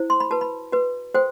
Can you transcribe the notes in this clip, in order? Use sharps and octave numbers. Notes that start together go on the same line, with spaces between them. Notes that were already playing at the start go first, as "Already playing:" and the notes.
Already playing: E4 C5
C6
B5
F#4 B4 A5
B5
F#4 B4
F#4 A4 C5 G5